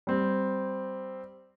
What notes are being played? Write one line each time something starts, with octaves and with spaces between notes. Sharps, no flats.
G3 C4